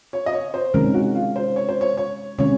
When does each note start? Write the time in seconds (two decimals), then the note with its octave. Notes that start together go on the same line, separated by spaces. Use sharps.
0.13 C#5
0.26 D#5
0.33 C#5
0.54 C5
0.74 C3 D#3 G#3 C#4 A#4
0.94 F#4
1.15 F4
1.36 C5
1.56 C#5
1.69 C5
1.81 C#5
1.97 C#5
2.39 C3 D#3 G#3 C#4 C#5